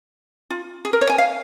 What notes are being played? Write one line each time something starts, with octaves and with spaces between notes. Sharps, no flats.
F4
G#4
A#4
C#5
G#5
F5